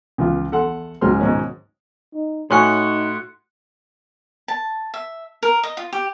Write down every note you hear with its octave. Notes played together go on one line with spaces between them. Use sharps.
C#2 E3 F4
E2 A4 F#5 C6
C#2 G#2 F#3 G#4 C6 F6
G#2 B2 D#3 C#4
D#4
A2 D#4 F#4 C#5 G#5 C6 F#6 C#7
A5
E5
A#4
D#5
F4
G4